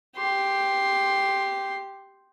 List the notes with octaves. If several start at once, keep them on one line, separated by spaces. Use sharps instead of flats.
G4 C6